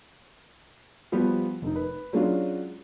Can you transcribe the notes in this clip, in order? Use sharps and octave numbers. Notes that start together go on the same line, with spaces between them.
F3 G3 B3 F#4 G4
F1 D#4
B4
F#3 G#3 C#4 D4 F4 F#4